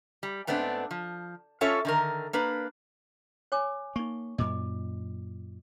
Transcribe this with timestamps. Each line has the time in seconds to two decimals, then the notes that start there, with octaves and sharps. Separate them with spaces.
0.23 G3
0.47 G#2 A3 B3 C4 D4
0.91 F3
1.61 C#4 F4 A4 C#5 E5
1.85 D3 D#3 A#4
2.33 A#3 D4 B4
3.52 C#5 G#5 D6
3.96 A#3 D#4 C#6
4.38 F#2 A#2 D#5 D6